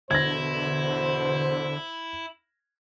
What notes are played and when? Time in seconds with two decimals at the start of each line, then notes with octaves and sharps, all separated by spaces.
0.11 E2 B2 D3 E4 C5 G#6 A#6